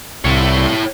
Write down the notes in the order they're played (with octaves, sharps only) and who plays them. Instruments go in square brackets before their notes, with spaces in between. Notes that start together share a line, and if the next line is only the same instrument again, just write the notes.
[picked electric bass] C2 [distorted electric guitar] E4 C#5